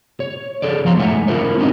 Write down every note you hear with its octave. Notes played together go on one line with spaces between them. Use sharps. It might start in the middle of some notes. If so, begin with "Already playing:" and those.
C#5
G#4 A4 C#5 D5
F3 B3 F5 A#5 C6
A2 G#3 E5 F#5 G#5
E4 F4 A#4 C5 C#5
C4 D4 D#4 F4 F#4 D#5